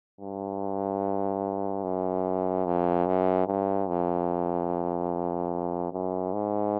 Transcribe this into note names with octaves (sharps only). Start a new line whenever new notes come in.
G2
F#2
F2
F#2
G2
F2
F#2
G#2